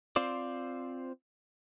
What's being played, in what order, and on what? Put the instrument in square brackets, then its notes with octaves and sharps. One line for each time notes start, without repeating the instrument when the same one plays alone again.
[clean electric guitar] C4 F4 C5 D5